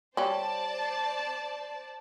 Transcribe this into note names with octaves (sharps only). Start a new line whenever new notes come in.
G3 C#4 C5 D5 A5